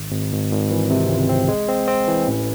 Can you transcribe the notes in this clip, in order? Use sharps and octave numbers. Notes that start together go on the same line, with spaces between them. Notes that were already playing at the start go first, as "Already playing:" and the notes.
Already playing: G#1
G#1
G#1
G#1
E3
C3
C#2
C4
G#3
C4
C4
E3
A1